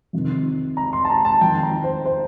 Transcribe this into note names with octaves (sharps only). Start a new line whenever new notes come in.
F2 C3 D#3
A#5
C6
A5
A#5
A5
F2 D#3 G5
A#5
C5
C5